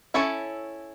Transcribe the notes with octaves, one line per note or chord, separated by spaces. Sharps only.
C#4 E4 A4 C#5 E5